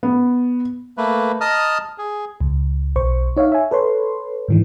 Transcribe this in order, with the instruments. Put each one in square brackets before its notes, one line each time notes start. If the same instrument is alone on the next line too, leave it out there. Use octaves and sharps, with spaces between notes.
[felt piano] B3
[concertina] A3 A#3 B4
D#5 A5 A#5 D#6 F6
G#4
[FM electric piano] C#2
B1 C5 C#6
D#4 C#5 E5 F5
E5 G#5
A4 B4 C#5 C6
G#2 D#3 E3